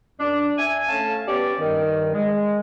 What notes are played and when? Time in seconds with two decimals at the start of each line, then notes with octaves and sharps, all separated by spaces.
0.20 F#2 D4
0.58 E5 G#5
0.88 A3 C#4 F5 A5
1.28 B3 C#4 G4 D5
1.60 G2 D#3
2.13 G#3